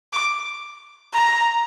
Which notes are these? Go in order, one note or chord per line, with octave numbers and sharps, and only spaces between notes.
D6
A#5